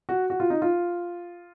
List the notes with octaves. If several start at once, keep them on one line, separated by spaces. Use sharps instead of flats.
F#4
F#4
F4
D#4
F4